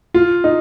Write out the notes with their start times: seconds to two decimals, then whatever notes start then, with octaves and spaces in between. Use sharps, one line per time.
0.14 F4
0.44 D#4